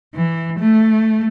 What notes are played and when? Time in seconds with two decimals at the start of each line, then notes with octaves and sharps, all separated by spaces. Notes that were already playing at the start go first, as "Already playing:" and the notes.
0.15 E3
0.60 A3